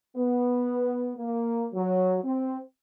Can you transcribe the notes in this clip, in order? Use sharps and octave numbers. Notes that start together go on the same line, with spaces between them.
B3
A#3
F#3
C4